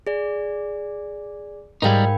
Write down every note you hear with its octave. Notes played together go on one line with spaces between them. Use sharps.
G#4 D5
G#2 G3 D#4 A#4 F5 G5 B5 G#6